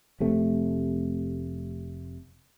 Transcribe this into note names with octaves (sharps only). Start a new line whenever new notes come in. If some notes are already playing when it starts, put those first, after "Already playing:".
F1 C3 A3